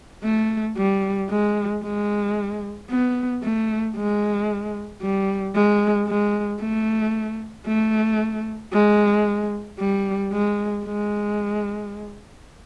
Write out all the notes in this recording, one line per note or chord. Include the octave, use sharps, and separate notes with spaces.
A3
G3
G#3
G#3
B3
A3
G#3
G3
G#3
G#3
A3
A3
G#3
G3
G#3
G#3